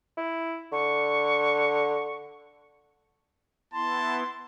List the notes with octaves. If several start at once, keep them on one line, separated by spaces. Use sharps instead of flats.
E4
D3 C#6
B3 E4 A5 C6